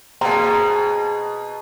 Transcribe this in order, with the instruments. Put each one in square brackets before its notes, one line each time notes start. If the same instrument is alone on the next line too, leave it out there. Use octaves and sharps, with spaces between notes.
[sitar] B2 [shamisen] A#3 C4 [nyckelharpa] G#4 [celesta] A#5